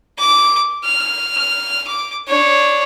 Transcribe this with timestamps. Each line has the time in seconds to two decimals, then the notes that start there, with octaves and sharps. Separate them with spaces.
0.18 D6
0.85 F6
1.88 D6
2.28 D4 C#5